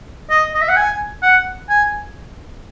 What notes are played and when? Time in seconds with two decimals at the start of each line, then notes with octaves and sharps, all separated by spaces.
0.30 D#5
0.54 D#5
0.62 E5
0.69 F#5
0.77 G#5
1.23 F#5
1.69 G#5